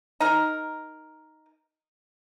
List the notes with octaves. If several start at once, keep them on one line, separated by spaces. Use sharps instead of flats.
D#4 A#4